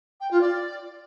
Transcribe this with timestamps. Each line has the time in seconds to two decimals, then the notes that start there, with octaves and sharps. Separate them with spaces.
0.21 G5
0.31 F4
0.41 D5